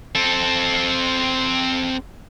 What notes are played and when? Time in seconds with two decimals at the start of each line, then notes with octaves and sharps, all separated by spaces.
0.15 C4 A4